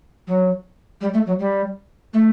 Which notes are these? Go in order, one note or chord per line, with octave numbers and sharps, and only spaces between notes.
F#3
G3
A3
F#3
G3
A3